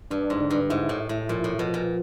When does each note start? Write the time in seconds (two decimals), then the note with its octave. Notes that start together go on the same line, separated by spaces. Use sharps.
0.11 G2 D4
0.30 G#2
0.41 D3
0.50 G2
0.70 G#2 E4
0.89 A2
1.00 E4
1.09 A2
1.29 A#2 F3
1.44 A2
1.58 B2 F3
1.74 A#2